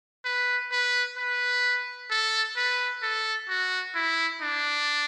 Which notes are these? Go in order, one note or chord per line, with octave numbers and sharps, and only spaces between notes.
B4
B4
B4
A4
B4
A4
F#4
E4
D4